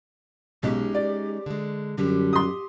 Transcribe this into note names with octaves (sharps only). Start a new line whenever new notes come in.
B1 G#3 C#4 D#4 G4
D5
D3 G#3
F#2 D3 G3 G4
C6 D#6